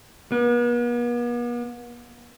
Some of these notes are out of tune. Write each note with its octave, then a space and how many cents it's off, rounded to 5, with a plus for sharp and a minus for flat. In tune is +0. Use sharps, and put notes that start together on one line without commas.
B3 -45